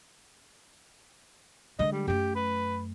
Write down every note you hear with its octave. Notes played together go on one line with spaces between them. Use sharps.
D3 G#3 D#5
G3
F#2 A3 G4
B4